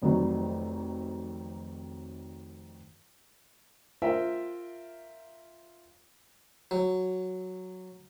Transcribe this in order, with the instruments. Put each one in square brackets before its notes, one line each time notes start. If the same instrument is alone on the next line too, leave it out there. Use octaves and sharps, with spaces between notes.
[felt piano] F1 F2 D#3 F#3
[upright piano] F4 A#4 C5 E5 G5
[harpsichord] F#3